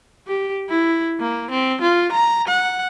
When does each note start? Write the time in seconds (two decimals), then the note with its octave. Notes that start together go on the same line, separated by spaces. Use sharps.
0.27 G4
0.69 E4
1.20 A#3
1.51 C4
1.82 F4
2.12 A#5
2.48 F#5